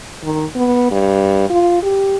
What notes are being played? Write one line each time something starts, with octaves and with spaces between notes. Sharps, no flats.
D#3
B3
G2
F4
G4